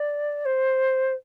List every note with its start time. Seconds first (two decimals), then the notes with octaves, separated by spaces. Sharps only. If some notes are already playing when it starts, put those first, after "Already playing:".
Already playing: D5
0.45 C5